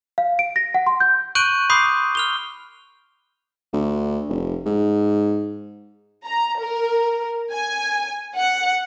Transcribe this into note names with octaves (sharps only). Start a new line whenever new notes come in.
F5
D7
A#6
F#5
C6
G6
C#6 F#6 G6 D7 D#7 F#7
B5 C6 D6 D#6 G6 C7
F6 F7 G7
D2
F1
G#2
A#5
A#4
G#5
F#5